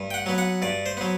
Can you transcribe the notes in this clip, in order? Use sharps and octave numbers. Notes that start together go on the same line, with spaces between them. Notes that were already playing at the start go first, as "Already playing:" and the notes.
Already playing: G2
G5
F#5
F#3 B3
F#5
G2 D5
C5
F#3 B3